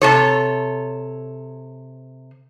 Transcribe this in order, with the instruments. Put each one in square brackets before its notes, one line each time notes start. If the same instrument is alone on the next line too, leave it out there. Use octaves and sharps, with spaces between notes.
[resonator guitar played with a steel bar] C3 A4 C#5